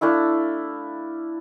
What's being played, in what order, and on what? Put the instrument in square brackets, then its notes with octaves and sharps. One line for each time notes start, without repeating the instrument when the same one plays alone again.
[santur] A3 D4 E4 F5